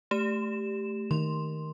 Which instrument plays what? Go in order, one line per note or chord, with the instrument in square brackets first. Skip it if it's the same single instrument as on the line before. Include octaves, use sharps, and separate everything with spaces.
[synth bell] A3 G4 E7
[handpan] D#3 [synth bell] C6